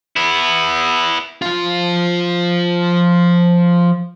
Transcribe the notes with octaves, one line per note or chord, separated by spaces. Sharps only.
B3 E4
F3 F4